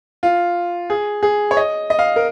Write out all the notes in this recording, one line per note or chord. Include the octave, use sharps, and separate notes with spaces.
F4
G#4
G#4
C#5
D#5
D#5
F5
A#4